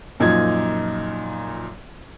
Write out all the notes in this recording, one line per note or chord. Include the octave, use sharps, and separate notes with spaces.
F#2 A#2 F3 D#4 G#6